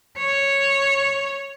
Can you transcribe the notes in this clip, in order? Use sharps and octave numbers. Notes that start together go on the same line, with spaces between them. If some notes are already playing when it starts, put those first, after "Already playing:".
C#5